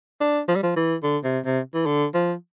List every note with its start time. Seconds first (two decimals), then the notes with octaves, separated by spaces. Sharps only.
0.20 D4
0.48 F3
0.56 G3
0.63 F3
0.76 E3
1.03 D3
1.24 C3
1.45 C3
1.74 E3
1.86 D3
2.14 F3